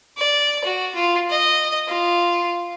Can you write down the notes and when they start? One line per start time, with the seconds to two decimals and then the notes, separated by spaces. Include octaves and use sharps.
0.18 D5
0.64 F#4
0.95 F4
1.30 D#5
1.88 F4